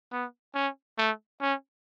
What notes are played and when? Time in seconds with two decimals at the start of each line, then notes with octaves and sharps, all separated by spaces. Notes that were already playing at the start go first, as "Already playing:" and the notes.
0.12 B3
0.55 C#4
0.98 A3
1.41 C#4